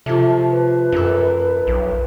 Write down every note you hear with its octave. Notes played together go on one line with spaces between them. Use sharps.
C3 F3 A3
B4
F#2 A#3 A4
B1